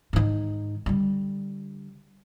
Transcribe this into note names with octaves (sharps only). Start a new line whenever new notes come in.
G#2 D#3
D3 G3